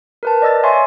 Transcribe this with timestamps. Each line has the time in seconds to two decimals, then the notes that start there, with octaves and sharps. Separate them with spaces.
0.23 A#4 B4 A5
0.42 D5 D#5 E6 A6
0.63 C#5 E5 G#5 C6 C#6